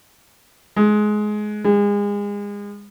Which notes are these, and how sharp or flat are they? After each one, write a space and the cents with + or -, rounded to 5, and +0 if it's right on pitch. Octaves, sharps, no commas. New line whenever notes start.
G#3 +20
G#3 -30